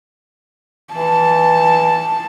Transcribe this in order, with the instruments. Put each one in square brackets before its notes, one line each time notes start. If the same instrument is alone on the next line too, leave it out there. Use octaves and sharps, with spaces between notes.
[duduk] E3 [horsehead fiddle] A5